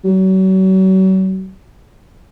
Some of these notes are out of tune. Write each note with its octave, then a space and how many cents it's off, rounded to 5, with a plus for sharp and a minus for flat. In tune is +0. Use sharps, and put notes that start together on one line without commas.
F#3 +40